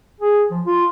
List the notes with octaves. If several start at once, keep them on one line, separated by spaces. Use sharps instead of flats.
G#4
F3
F4